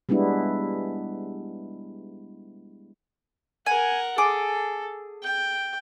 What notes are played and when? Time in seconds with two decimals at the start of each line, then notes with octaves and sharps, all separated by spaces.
0.09 G3 G#3 B3 D4 E4
3.66 A#4 F#5 G#5
4.18 G#4 A4 D6
5.23 G5